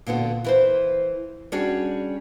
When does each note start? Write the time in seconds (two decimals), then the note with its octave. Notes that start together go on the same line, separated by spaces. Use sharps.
0.07 A#2 D3 B3 F#4
0.44 E3 B4 C5
1.52 G3 C#4 D4 F#4 G#4